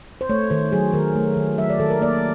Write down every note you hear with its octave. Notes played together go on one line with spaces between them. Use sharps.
C5
A3 C#5
D#3 C5
F#3 G#4
D#3 A#4
A3
D#3
F#3 E5
D5
D#3 A4
A#4
A#3 D5